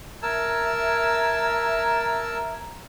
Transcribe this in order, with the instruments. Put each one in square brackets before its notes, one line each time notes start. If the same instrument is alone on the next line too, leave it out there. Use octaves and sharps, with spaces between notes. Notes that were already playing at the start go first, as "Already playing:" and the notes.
[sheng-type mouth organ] A#4 A5 E6 [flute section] E5 A#5 G#6